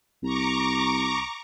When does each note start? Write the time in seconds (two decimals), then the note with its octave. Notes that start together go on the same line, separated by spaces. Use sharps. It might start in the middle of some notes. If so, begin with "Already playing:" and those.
0.23 C2 A#5 C#6 D6